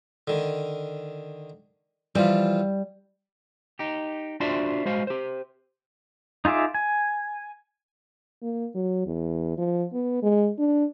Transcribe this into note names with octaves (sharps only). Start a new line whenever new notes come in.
D3 D#3
E3 F3 G3 F4
D#4 G4
D4 F4 F#4 C5 D5 E5
G#3 F#4 C5 F5
G4 C5
D#4 F4 G#4 E5 D6
G#5
A#3
F#3
E2
F3
B3
G#3
D4